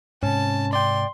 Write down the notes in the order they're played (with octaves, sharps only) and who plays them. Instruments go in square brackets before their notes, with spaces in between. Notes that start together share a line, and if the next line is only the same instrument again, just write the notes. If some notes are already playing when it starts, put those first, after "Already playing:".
[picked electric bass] G#2 C3 [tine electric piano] C#4 [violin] A5
[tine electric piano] D5 G5 [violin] C6